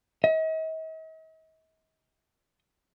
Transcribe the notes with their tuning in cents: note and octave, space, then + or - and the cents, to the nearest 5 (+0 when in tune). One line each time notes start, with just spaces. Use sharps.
D#5 +45